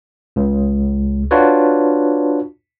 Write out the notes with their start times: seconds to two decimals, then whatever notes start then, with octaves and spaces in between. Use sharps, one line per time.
0.36 C#2
1.31 D4 F4 F#4 B4 C#5